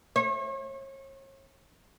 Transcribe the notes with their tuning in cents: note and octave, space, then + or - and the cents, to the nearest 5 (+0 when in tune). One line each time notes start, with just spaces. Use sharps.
C#5 -40